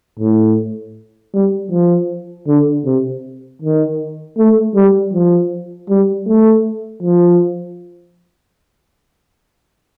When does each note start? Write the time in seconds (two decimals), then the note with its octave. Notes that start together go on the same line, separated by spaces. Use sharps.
0.19 A2
1.34 G3
1.71 F3
2.47 D3
2.85 C3
3.62 D#3
4.37 A3
4.75 G3
5.13 F3
5.90 G3
6.27 A3
7.03 F3